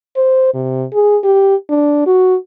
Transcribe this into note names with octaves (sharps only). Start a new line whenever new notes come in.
C5
C3
G#4
G4
D4
F#4